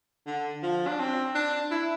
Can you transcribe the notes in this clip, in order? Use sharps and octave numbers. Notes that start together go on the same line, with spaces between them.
D3
F3
D4
C4
D4
E4